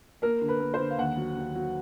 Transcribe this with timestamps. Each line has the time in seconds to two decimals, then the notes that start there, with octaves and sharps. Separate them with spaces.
0.22 A#3 A#4
0.41 D3
0.48 B4
0.60 A#3
0.74 C5
0.80 D3
0.90 F5
0.98 D#2 F#5
1.17 F#3
1.37 D#2
1.55 F#3